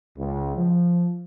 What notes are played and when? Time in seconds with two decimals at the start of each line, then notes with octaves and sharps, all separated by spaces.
0.18 C#2
0.57 F3